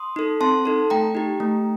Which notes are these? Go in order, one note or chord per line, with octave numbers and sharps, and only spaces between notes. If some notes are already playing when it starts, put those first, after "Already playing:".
Already playing: C6 D#6
D#4 A4
C4 A5 C6
D#4 A4
A3 G5 A#5
D#4 G4
A3